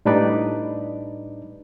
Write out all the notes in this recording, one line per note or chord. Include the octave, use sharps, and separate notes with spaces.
A2 G3 D4 D#4 B4 D5